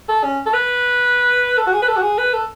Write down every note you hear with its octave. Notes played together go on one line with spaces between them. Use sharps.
A4
C#4
A4
B4
A4
F#4
G#4
B4
A4
F#4
G#4
B4
A4